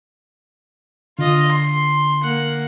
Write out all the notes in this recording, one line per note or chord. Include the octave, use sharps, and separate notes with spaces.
D3 F4 D#5
C6
A#3 F#5